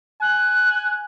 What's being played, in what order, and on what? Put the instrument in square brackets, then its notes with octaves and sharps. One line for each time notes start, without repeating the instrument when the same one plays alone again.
[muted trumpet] G#5 [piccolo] F#6